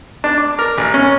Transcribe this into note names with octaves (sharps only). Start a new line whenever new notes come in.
D4
D6
A#4
A1
C#4